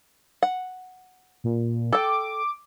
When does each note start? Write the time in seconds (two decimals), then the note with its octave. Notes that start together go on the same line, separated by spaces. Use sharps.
0.43 F#5
1.44 A#2
1.93 A4 G5 D6